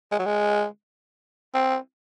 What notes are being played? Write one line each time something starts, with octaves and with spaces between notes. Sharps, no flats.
G#3
F#3
G#3
C4